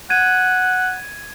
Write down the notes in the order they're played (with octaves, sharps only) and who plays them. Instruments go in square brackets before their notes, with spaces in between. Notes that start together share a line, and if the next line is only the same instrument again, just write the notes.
[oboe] F#5 [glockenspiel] G#6 D#7